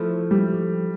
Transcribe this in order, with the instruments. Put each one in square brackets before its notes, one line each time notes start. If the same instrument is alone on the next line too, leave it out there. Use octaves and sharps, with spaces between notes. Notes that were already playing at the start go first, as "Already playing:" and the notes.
Already playing: [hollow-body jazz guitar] F3 A3 E4 A4
[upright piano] G3